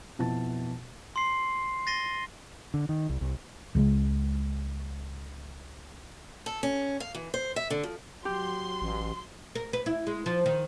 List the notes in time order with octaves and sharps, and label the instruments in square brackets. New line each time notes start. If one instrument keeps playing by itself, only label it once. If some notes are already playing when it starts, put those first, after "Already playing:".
[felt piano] F2 B2 E4 A5 A6
[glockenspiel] C6 C7
A6 A#6 C7 D#7 G7
[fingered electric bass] D3
D#3
C2
C2
C#2 C#3 F3 G#3
[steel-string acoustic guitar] A4
C#4
F5
E3
C5
E5
D3
F3
[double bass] F#3 [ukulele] G4 [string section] C6
[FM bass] A1
[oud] A#4
B4
E4
G#3
F3
D#3